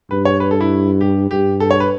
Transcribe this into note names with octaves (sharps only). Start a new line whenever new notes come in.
G2 B4
C#5
B4
A4
E4
G4
G2 G4
A4
C#5
B4